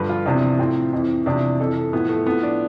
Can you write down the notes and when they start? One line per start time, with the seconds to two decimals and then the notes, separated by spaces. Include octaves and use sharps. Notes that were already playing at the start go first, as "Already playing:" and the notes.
Already playing: G2 D3 F3 B4
0.09 F4
0.26 E2 C3 F3 D4
0.58 A2 F3 C4
0.92 F2 E3
1.26 E2 C3 F3 D4
1.60 F2 E3 A4
1.76 A4
1.93 A2 F3 B3
2.09 A3
2.26 A2 F3 B3
2.43 D4